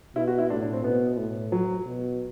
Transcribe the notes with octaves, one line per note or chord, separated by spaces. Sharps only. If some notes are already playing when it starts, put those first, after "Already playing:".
B2 E4
F#4
E4
A2 D4
D4
C4
B2 B3
A2
F#3
B2